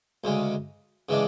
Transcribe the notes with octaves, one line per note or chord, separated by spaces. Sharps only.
D2 C#3 G#3
C#3 E3 G#3 D4